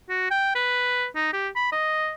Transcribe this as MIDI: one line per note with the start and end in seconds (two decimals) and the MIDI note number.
0.09 0.28 66
0.31 0.54 79
0.55 1.06 71
1.15 1.30 63
1.33 1.48 67
1.56 1.70 83
1.72 2.15 75